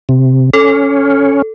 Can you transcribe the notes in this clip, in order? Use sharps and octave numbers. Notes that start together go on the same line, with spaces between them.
C3
C#4 A4